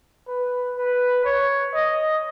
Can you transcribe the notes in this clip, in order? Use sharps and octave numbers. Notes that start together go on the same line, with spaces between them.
B4
B4
C#5
D#5